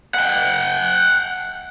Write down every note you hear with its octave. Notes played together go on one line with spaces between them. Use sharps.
F#5 G5